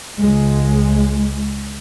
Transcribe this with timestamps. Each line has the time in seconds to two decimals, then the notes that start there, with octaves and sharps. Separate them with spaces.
0.20 C#2 G#3